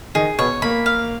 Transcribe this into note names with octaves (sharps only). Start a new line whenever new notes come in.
D#3 D#4 G#4
B2 B3 C#5
A#3 B5
F5